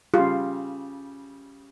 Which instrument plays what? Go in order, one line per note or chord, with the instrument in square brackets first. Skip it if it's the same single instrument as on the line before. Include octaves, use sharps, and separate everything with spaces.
[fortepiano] C#3 G3 [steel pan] F4